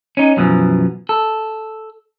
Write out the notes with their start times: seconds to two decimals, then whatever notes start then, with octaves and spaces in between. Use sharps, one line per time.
0.17 C#4 D#4
0.37 F#2 B2 E3 F3
1.09 A4